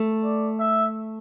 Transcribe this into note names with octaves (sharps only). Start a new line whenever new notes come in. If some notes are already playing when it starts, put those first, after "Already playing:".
Already playing: A3
D5
E5